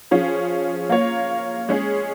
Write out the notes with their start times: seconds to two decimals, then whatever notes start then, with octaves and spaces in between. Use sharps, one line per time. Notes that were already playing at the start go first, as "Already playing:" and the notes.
0.11 F3 C#4 F4 G#4
0.90 A#3 F4 C#5
1.69 G#3 C#4 G#4